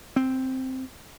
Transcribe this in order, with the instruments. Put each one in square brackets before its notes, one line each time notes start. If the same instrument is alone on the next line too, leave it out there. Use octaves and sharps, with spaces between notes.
[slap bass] C4